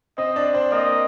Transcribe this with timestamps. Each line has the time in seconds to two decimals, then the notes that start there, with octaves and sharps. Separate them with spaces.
0.18 C4 C5 D#5
0.36 D4 D5
0.54 C4 C5
0.71 A#3 A#4 D#5